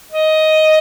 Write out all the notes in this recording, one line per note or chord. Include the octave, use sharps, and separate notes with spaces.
D#5